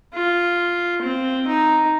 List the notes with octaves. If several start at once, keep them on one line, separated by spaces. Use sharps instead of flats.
F4
C4
D#4